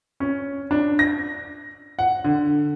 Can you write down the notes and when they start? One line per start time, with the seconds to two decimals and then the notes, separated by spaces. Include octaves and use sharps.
0.20 C#4
0.71 D4
0.99 A#6
1.99 F#5
2.24 D3